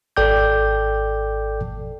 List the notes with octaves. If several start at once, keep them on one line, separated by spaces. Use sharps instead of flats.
G#1 A4 D5 G5 D6 G6